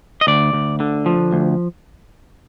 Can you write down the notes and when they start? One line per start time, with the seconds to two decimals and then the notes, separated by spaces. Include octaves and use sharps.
0.21 D#5
0.27 D2 D5
0.53 D2
0.80 D3
1.06 F3
1.32 D2